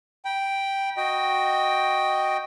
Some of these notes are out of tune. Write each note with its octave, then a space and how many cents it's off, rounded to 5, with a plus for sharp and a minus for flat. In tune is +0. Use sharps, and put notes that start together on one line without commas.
G5 +0 B5 -35
F#4 +0 D#5 +0 G5 +0